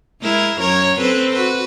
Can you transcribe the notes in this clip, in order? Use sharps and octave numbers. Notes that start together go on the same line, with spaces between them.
G#3 E4 A#4
F#2 A#4 C#5
C4 A4 B4
F#4 B4